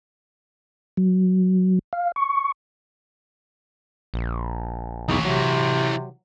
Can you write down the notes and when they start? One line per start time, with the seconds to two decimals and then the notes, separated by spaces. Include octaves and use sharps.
0.97 F#3
1.93 F5
2.16 C#6
4.14 A#1
5.09 B1 E2 E3 D#4 C#5
5.25 C3 F#3